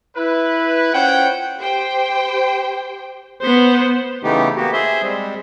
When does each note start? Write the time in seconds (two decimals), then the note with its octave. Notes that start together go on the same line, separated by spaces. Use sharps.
0.17 E4 B4
0.94 C#4 F4 C5 C#5 F#5 G5
1.59 G4 C5 G5
3.42 B3 C5
4.24 C#3 E3 A3 B3 D#4 G4
4.57 A#3 B3 F#4 G4
4.73 G#4 C5 E5 C6
5.02 G3 G#3 C4